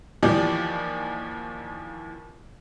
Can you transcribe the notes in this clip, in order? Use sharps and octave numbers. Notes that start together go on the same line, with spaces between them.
D#2 E3 F3 G4 D5